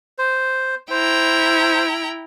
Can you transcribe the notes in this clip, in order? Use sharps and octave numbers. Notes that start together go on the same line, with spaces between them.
C5
E4 C5 G5 A#5